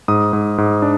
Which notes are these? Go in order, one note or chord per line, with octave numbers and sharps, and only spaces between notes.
G#2 D#6
G#2
G#2
D4